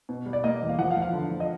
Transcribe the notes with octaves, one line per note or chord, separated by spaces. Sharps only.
B2
G3
D5
A#3 D#5
E2
F5
F3 F#5
F5
F3
F5
D3
F3
D#5